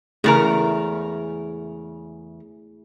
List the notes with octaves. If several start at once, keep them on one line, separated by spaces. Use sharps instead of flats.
E2 C#3 A3 E4 G#4 A#4